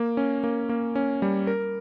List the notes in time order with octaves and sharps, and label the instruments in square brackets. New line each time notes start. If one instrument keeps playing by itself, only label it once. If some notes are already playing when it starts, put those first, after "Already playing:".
Already playing: [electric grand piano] A#3
C#4
A#3
A#3
C#4
G3
A#4